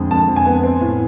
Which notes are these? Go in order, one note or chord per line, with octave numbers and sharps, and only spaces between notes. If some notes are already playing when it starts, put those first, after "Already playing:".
Already playing: F2 D3 G#3
F2 A5
F2
G#5
B3
C4
A2